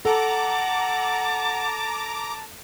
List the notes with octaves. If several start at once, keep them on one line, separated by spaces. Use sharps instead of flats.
A4 F#5 A5 A#5 D6